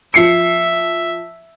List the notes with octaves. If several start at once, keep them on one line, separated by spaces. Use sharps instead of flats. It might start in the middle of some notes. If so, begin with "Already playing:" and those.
F3 E5 C7 C#7